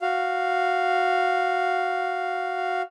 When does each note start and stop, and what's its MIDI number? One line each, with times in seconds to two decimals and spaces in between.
0.01 2.82 66
0.01 2.82 77